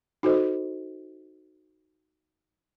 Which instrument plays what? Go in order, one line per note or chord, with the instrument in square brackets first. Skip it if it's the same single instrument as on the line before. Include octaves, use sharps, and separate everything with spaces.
[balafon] D#4 F#4 A4 C5 D#5